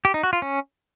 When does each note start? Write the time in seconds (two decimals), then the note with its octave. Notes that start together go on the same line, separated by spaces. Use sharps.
0.05 G4
0.14 D#4
0.23 F#4
0.33 F4
0.42 C#4